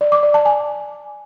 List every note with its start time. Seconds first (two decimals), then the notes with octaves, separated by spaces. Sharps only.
0.01 D5
0.12 D6
0.23 D5
0.34 A5
0.45 G#5